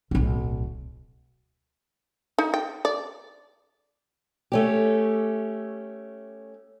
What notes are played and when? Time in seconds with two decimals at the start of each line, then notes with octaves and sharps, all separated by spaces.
0.11 D1 B1
2.38 D#4
2.54 G5
2.85 D5
4.52 A3 C#4 G4